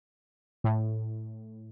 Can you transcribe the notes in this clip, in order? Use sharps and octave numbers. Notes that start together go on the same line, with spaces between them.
A2